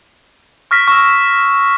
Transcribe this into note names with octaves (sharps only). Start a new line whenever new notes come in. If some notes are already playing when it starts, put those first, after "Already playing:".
C#6 F6 A#6 B6
C#6 E6